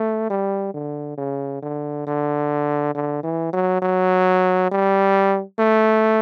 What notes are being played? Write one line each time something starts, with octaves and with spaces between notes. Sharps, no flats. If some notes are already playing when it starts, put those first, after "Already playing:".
Already playing: A3
G3
D3
C#3
D3
D3
D3
E3
F#3
F#3
G3
A3